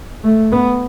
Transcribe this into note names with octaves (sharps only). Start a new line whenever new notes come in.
A3
B3